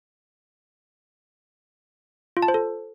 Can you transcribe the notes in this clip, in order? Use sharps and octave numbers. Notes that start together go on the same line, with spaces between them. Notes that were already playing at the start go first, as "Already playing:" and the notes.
F4
A5
C5
A4